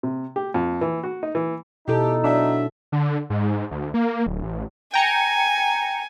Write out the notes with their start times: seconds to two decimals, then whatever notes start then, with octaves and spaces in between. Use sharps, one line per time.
0.03 C3
0.36 G4
0.54 F2
0.81 E3
1.04 F#4
1.23 D#4
1.35 E3
1.88 B2 D#4 E4 G4 A4
2.24 F#3 D4 E5
2.92 D3
3.30 G#2
3.71 D2
3.94 A#3
4.27 D1
4.43 A1
4.94 G5 G#5 A#5 C#7